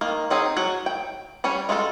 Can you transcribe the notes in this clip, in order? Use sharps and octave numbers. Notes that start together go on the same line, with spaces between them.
D#3 A#3
F#3 C4 D#4 G#4
F#3 F#4 C#5
G5
G3 C#4 B4 C#5
G#3 F4 F#4 A4